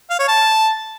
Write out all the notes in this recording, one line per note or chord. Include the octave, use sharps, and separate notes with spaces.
F5
C#5
A5